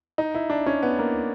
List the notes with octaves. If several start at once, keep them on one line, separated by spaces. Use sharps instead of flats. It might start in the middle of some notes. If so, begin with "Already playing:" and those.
D#4
E4
D4
C#4
B3
A#3